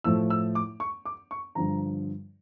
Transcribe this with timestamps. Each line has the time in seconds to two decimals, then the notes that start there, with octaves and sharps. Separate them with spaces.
0.04 A2 F3 A3 E4 E6
0.30 E6
0.55 D6
0.80 C#6
1.05 D6
1.31 C#6
1.55 G2 D3 F3 A#5